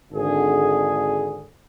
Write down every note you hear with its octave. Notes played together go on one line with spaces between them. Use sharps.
G#1 D3 G#4